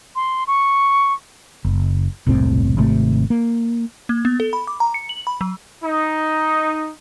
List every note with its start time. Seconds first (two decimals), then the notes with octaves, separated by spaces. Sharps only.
0.16 C6
0.47 C#6
1.65 F#1
2.27 E1 C2 A2 C4
2.77 G#1 C3 A3
3.30 A#3
4.09 A#3
4.25 B3
4.40 A4
4.53 B5
4.67 D6
4.80 A#5
4.94 C#7
5.09 F#7
5.27 B5
5.41 F#3
5.82 D#4